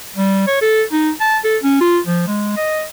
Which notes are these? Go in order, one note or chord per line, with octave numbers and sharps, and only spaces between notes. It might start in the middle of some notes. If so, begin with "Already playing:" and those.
G3
C#5
A4
D#4
A5
A4
C#4
F4
F3
G#3
D#5